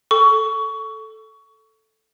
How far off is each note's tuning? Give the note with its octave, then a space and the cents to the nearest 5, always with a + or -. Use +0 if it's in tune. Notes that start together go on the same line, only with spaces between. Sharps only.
A4 +0 C#6 +20